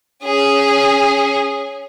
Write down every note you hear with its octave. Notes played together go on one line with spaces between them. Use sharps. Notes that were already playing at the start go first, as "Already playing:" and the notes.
C#4 G#4